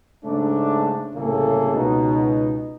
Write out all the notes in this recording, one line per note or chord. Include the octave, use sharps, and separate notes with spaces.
G#2 C#3 A3 D4
C2 A2 C#3 A#3 G#4 A4
C#2 B2 D#4